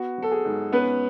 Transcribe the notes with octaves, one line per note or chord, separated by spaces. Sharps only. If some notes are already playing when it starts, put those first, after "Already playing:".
Already playing: B3 F#4
F#3 A4
G#4
G#2
B3 C#4 B4